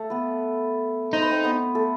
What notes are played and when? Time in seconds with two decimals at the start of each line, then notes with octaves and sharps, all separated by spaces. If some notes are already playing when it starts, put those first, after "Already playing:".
Already playing: A3 A4
0.10 B3 B4
1.13 D#4 C5
1.22 B4
1.31 C4 C5
1.44 B3 B4
1.75 A3 A4